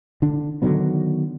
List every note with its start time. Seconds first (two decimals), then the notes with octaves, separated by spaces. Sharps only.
0.22 D3 D4
0.62 D3 D#3 F#3 B3